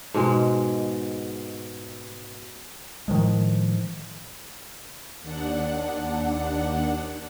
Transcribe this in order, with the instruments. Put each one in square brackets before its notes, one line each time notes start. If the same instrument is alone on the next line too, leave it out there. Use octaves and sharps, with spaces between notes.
[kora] G#2 B2 G#3
[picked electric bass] A2 D#3 F3 G#3
[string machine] D#2 D4 F#5